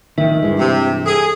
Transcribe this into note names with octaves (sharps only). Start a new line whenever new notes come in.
D1 A#1 D#3 E5
G2 E3 G#3
C3
G#4 A4